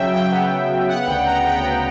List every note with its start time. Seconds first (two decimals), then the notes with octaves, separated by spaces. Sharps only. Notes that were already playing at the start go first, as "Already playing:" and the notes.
Already playing: C#3 F#3 E5 G5
0.13 F#3 G5
0.31 B3
0.50 B3
0.69 C#3
0.88 B3 F#5
1.07 D2 G5
1.26 D2 A#5
1.44 B3 G5
1.63 B3